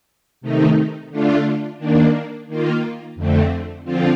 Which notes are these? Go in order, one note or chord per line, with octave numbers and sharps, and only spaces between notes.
C3 D#3 A3 D#4
D3 A3 D4 F4
D#3 A#3 D4
D#3 A#3 F4
F2 D3 A3 C4
D3 F3 C4 F4